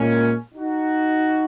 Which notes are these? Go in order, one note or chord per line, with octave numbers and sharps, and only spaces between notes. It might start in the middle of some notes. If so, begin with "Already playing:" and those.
Already playing: A#2 G#3 A#3 C#4
D#4 F#4